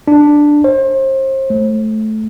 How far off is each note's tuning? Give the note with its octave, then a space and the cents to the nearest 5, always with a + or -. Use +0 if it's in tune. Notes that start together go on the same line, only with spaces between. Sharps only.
D4 +5
C5 +35
A3 -15